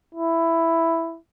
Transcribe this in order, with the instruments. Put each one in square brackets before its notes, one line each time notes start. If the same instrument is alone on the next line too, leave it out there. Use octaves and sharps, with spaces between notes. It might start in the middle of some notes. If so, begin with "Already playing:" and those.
[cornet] E4